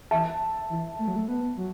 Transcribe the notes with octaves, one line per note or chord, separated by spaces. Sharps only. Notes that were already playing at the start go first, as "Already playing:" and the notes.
E3 E5 A5
E3
A3
F#3
A3
B3
F#3